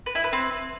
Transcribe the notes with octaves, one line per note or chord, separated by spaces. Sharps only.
B4
E4
B4
C4